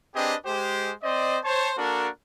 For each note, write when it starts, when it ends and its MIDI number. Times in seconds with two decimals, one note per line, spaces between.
0.15 0.35 60
0.15 0.35 62
0.15 0.35 67
0.15 0.35 68
0.15 0.35 71
0.15 0.35 75
0.46 0.93 56
0.46 0.93 67
0.46 0.93 72
1.04 1.38 60
1.04 1.38 72
1.04 1.38 74
1.04 1.38 75
1.44 1.72 72
1.44 1.72 73
1.44 1.72 81
1.78 2.09 58
1.78 2.09 62
1.78 2.09 66
1.78 2.09 69
1.78 2.09 70